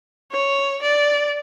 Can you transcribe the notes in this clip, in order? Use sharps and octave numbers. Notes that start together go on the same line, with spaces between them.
C#5
D5